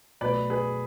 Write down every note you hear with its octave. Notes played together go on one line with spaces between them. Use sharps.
B2 F#3 A3 B4 D5
G#4 B4